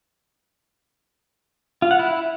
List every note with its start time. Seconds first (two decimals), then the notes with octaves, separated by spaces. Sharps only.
1.82 F4
1.91 F#5
1.99 E4